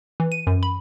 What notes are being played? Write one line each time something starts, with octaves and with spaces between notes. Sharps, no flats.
E3
D#7
F#2
B5